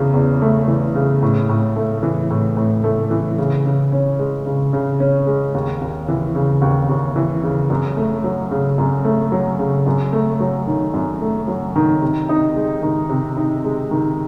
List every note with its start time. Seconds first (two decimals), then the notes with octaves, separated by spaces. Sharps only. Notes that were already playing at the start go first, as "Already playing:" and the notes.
Already playing: E2 C#3 E3
0.14 E2
0.42 A3
0.68 E3
0.95 C#3
1.22 A2
1.49 A2
1.76 A3
2.03 E3
2.30 A2
2.57 A2
2.84 A3
3.11 E3
3.38 C#3
3.66 C#3
3.92 C#4
4.19 G#3
4.46 C#3
4.73 C#3
5.00 C#4
5.27 G#3
5.54 D#2
5.82 D#2
6.08 E3
6.35 C#3
6.62 D#2
6.89 D#2
7.16 E3
7.44 C#3
7.70 F#2
7.97 A3
8.24 F#3
8.51 C#3
8.78 F#2
9.05 A3
9.32 F#3
9.59 C#3
9.86 F#2
10.13 A3
10.40 F#3
10.67 D#3
10.94 F#2
11.21 A3
11.48 F#3
11.76 D#3
12.02 C3
12.29 D#4
12.56 G#3
12.82 D#3
13.09 C3
13.37 D#4
13.64 G#3
13.91 D#3